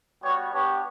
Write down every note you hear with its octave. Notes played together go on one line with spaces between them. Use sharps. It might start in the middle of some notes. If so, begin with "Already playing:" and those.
G3 B3 F#4 C#5
B3 D4 G4 C#5